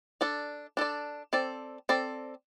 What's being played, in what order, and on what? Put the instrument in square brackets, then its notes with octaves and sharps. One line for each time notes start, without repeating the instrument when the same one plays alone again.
[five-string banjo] D4 A4 D5
D4 A4 D5
C4 A4 D5
C4 A4 D5